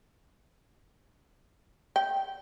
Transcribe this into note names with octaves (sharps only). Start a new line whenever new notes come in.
G5